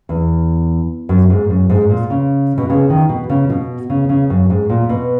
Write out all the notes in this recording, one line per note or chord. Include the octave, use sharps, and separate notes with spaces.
E2
F#2
G#2
F#2
G#2
A#2
C#3
B2
C#3
D#3
B2
C#3
B2
C#3
C#3
F#2
G#2
A#2
B2